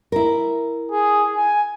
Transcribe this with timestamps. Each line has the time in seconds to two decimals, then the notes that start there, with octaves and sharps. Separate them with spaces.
0.12 E4 A#4
0.92 G#4
1.36 G#5